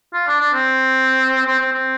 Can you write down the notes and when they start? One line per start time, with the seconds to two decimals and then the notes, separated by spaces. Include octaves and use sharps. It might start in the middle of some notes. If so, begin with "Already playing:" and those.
0.14 F4
0.27 D4
0.40 D4
0.53 C4
1.46 C4
1.59 C4
1.72 C4